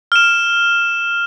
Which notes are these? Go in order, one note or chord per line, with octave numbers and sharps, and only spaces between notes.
F6 E7